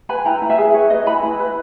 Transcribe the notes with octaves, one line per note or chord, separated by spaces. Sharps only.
B4 G#5 B5
E4 G5 A#5
E4
E5 G#5
G#4
B4 C#5
E4 B4 D#5
E4 G#5 B5
E4
B4